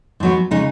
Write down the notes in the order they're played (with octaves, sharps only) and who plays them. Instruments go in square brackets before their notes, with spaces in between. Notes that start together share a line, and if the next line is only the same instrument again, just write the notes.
[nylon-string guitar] G#2 F#3 B3
C#3 G#3 D#4